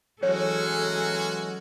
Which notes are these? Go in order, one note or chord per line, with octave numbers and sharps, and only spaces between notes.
E3 F#3 G#3 C#4 F#4 A4 C#5